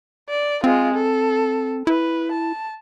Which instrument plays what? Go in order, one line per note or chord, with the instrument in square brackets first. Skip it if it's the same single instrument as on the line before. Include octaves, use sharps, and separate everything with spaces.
[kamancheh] D5
[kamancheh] G#3 F4 [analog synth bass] C4
[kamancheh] A4
[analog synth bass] E4 [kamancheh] B4
[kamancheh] A5